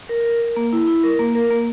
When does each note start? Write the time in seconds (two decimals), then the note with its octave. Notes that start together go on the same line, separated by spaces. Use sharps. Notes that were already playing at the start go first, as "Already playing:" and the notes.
0.09 A#4
0.25 A#4
0.41 A#4
0.57 A#3
0.73 E4
0.88 E4
1.03 A#4
1.19 A#3
1.35 A#4
1.50 A#3